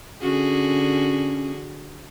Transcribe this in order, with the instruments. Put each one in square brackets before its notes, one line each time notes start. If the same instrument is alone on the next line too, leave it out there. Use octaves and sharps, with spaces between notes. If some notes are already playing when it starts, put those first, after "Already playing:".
[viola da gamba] D3 F#4 G#4 [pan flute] C#4